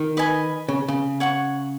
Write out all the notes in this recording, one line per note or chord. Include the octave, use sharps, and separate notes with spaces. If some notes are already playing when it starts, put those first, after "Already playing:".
Already playing: D#3
B4 D#5 G#5 B5
C#3
C#3
C#5 F#5 C#6